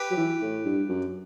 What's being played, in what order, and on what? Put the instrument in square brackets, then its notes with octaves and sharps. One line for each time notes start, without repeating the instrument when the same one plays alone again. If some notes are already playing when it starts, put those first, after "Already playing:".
Already playing: [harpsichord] G4 B4
[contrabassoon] F#3
E3
A2
G2
F#2